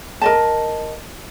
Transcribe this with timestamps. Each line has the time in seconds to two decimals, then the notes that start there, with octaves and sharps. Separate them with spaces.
0.22 A#4 D#5 A5